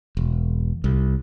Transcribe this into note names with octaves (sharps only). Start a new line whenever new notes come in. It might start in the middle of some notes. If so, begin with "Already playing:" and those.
E1
C2